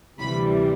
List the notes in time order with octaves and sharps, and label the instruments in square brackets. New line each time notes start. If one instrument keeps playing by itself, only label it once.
[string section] D2 C3 E3 G3 B5